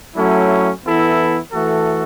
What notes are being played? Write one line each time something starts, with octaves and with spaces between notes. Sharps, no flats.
F#3 A3 C#4 E4
E3 B3 E4 A4
E3 A3 F#4 A4